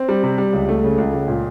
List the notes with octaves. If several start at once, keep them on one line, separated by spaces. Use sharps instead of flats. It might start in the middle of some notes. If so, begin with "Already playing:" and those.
Already playing: C4
G3
C3
G3
C#2
A3
C#3
C#2
C#2
A#2